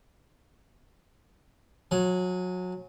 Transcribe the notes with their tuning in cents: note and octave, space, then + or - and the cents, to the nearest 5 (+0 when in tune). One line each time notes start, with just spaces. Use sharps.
F#3 -25 G#5 +0